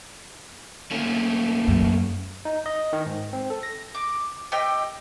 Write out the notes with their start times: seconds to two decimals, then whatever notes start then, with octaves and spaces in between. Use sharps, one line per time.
0.91 A3 A#3 C#4
1.67 F#2
2.45 D#4
2.66 D#5
2.93 D#3
3.06 G#2
3.33 C4
3.50 A4
3.63 A#6
3.95 D6
4.52 G4 D#5 G5 E6